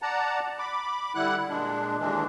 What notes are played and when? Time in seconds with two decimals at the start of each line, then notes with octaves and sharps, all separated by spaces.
0.02 D5 F#5 A5 A#5
0.59 B5 D6
1.15 D3 G3 E4 F#5 F#6
1.49 A#2 G#3 D4
1.99 D#2 D3 E3 G#3 D4